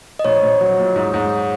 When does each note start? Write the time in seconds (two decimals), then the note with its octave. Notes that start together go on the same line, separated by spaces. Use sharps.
0.19 D#5
0.25 A#1 C#5
0.42 A#1
0.61 F#3
0.78 A#2
0.96 G#2
1.14 G#2